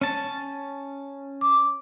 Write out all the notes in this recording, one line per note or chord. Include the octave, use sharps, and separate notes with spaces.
C#4 A5
D6